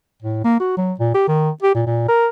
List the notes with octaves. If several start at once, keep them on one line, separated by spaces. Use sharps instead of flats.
A2
A#3
F#4
F#3
A#2
G4
D#3
G4
A#2
A#2
A#4